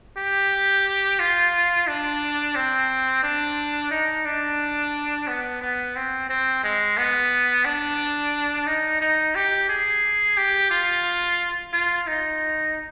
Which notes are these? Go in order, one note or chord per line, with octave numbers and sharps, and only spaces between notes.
G4
F4
D4
C4
D4
D#4
D4
B3
B3
C4
C4
G#3
B3
D4
D#4
D#4
G4
G#4
G4
F4
F4
D#4